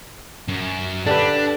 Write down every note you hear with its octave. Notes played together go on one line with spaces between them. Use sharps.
F#2
D3 D4 G4 B4